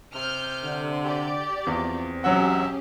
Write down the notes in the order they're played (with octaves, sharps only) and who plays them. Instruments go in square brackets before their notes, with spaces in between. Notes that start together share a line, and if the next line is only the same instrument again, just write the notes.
[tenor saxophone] C3 [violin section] F6 G6
[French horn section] D3
[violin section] G4 D5
[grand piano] E2 [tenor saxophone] F3 [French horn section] C4
[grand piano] E1 F#3 F#5 [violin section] C#4 G4 G#4 [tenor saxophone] E5